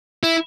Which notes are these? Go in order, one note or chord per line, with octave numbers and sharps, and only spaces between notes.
E4